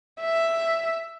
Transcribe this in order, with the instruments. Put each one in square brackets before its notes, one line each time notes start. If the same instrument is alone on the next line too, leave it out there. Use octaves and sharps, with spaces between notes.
[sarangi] E5